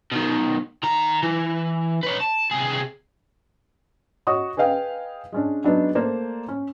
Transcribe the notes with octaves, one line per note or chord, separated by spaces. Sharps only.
B2 D#3
D#3 A#5
E3
B4 C#5
A5
C3 G#4
F#4 C#5 D#5 C#6 D#6
G#4 B4 D#5 F5 G5
G#3 C#4 D4
F#3 G#3 B3 D4 D#4
A3 A#3 C5 D5
C#4